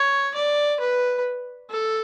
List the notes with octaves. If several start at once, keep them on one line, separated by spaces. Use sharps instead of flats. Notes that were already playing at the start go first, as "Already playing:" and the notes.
Already playing: C#5
D5
B4
A4